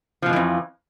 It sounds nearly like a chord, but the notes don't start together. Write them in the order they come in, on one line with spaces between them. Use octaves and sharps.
F3 B2 G#2 E3 F2